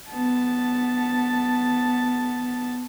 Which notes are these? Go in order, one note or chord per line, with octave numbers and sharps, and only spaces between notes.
B3 A5